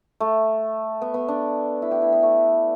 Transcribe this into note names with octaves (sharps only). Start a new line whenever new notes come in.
A3
B3
B3
D4
E4
G4
E4
B3
A3